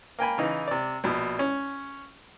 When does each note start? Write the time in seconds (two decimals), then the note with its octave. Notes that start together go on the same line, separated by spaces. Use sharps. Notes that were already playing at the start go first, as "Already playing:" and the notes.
0.19 A#3 G5 G#5 B5
0.38 C#3 E3 D#4
0.68 C3 D5
1.04 A#1 B2
1.39 C#4